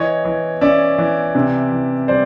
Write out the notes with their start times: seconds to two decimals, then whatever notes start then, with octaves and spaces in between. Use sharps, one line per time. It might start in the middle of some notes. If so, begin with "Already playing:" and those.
Already playing: E3 C#5 D#5
0.25 E3
0.61 C#4 D5 E5
0.98 E3
1.35 C3
1.72 E3
2.08 G3 C5 D5